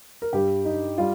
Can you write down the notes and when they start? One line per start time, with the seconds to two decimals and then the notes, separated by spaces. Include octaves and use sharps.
0.22 A#4
0.33 G2 G3 G4
0.65 D#4
0.98 G3 F4